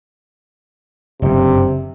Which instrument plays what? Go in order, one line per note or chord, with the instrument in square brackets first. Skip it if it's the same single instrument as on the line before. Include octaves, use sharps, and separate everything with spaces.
[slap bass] F#1 G2 [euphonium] C3